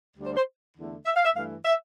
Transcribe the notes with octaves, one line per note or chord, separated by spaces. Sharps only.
D2 D3 G3
C5
C5
E2 D3 A3
E5
F5
E5
G2 E3 A3 F5
E5